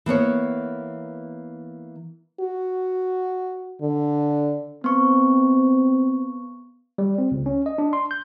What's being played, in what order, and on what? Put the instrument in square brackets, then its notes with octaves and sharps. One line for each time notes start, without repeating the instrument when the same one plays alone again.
[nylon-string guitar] E3 A#3 B3 C#5
[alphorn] F#4
D3
[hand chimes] B3 C#6 [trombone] C4
[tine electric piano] G3
C4
C#2
C#4
D#5
D4
C6
G6